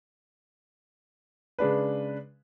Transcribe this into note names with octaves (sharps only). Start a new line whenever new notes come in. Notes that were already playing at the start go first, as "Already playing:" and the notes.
C#3 G#3 D4 B4